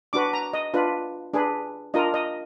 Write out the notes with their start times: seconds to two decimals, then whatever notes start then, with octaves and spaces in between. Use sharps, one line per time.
0.13 D4 F#4 B4 D6
0.33 A#5
0.53 D#5
0.74 D4 F4 B4
1.34 D4 G#4 B4
1.94 D4 F4 A#4 D#5
2.14 D#5